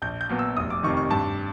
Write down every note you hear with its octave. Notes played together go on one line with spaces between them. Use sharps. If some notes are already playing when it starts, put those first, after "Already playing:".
A#1 G6
G6
A#2 F#3 B3
E6
F1 D#6
D6
F2 C3 D#3 C#6
C#6
G2 A5